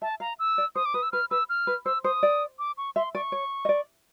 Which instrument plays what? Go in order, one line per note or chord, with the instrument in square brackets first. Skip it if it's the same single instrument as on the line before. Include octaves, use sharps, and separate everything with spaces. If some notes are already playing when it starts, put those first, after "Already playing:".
[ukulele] E5 [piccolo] A5
[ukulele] F5 [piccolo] A#5
[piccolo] E6
[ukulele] D5
[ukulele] C5 [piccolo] D#6
[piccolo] D6
[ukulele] B4 [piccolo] D#6
[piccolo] E6
[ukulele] B4 [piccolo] F6
[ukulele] B4 [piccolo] E6
[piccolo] F6
[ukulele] B4
[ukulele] C5 [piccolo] E6
[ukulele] C5 [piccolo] D#6
[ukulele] D5
[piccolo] D6
C#6
[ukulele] E5 [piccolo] C6
[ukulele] D5 [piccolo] C#6
[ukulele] C#5
D#5
D5